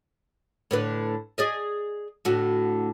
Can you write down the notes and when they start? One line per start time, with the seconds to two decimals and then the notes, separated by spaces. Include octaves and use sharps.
0.71 A2 D3 B4
1.38 G#4 D5 D#5
2.25 A2 D3 F#4